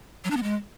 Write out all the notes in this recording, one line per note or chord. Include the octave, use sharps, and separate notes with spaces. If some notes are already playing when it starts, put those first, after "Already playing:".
F#3
D4
B3
G#3